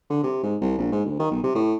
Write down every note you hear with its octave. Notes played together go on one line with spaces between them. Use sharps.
D3
C3
G#2
C2
A#1
G#2
D2
D#3
B1
C3
A2